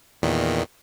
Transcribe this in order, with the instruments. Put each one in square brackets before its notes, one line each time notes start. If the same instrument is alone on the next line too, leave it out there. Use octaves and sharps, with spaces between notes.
[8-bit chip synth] E2 A#2 D#3